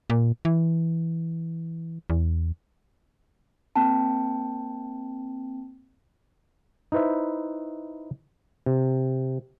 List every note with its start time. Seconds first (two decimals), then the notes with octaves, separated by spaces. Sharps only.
0.10 A#2
0.45 E3
2.10 E2
3.75 A#3 C4 G5 A5
6.92 D#4 E4 B4 C5 E5
8.66 C3